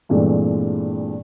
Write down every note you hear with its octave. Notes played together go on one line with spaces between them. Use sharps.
G2 A#2 E3 G#3 A3 C4